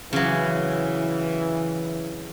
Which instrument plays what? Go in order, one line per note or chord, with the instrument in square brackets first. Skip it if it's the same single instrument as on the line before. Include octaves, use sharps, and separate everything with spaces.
[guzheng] C#3 F#3 [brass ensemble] E3